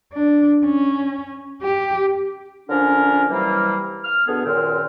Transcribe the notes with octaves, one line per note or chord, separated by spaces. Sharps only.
D4
C#4
G4
D3 F3 C#4 D4 A#4
C3 E3 F#3 G3 A#3
F6
B2 D3 B3 G#4
C#2 F#2 A#2 D#3 C4 F6